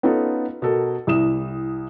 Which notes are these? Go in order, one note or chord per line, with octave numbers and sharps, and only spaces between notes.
B3 C#4 D#4 F4 A4
B2 A4 A#4
C2 E4 D#6 E7